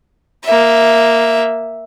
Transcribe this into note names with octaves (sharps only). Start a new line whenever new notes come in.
A#3 E5